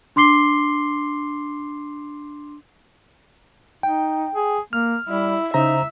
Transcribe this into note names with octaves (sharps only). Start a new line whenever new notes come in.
D4 C6 D6 C7 G7
D#4 G5
G#4
A#3 F6
G3 E4
C#3 D#4 C5 E5 A#5